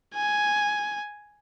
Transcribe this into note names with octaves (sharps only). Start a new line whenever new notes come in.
G#5